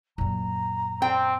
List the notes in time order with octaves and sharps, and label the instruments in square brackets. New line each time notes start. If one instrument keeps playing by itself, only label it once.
[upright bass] F#2 A#2 [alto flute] A#5
[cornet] C4 [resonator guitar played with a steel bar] G5